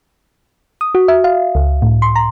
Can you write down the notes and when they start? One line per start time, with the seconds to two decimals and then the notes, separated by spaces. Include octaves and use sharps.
0.81 D#6
0.95 F#4
1.08 E5
1.24 F5
1.55 C#2
1.82 A2
2.02 C6
2.16 A#5